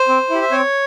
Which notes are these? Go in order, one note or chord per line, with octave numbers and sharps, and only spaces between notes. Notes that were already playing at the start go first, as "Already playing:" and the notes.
Already playing: C5
C4
E4 G4
E5
C4 C#5